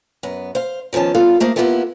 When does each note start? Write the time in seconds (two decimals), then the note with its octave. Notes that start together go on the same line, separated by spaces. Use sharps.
0.23 F#2 B3
0.55 C5 F5
0.93 D#3 F3 B3 C#4 A5
1.15 G3 B3 F4 A4 F5
1.40 A3 A#3 G#4 C5 F5
1.56 A#3 B3 E4 F4 G4 A4